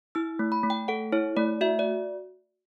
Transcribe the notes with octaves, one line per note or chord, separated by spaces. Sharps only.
E4 E6
A3
B5
A3
G5
A4 F#5
E4 C#5
A3 D5
F#4 E5
D5